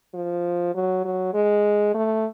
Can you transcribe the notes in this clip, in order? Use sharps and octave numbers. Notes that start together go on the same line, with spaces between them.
F3
F#3
F#3
G#3
A3